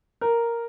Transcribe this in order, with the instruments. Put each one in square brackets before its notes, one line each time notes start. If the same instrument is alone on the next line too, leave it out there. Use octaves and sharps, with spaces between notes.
[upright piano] A#4